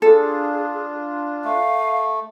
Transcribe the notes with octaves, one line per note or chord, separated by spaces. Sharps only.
D4 F4 G#4 A4
A3 F5